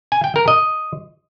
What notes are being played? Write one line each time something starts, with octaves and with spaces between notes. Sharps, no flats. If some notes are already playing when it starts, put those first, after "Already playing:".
G#5
G5
A#4
D#5